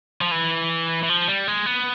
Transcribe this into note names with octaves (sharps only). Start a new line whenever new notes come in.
F3
E3
E3
F3
G3
G#3
B3